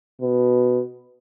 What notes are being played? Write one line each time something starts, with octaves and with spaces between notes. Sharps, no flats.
B2